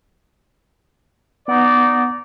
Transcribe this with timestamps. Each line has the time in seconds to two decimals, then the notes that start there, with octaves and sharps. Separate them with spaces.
1.48 B3 D#4 D5 F#5